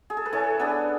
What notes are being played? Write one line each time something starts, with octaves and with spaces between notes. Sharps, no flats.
G#4
A4
B4
E3 A4 C#5
B3 D4 G#4 B4